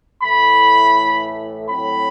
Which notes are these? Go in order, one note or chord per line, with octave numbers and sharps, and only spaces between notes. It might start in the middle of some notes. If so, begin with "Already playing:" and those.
A2 E3 A3 B5
A2 F#3 C4 B5